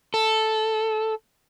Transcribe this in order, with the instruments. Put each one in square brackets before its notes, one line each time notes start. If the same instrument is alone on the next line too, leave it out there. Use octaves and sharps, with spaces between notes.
[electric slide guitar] A4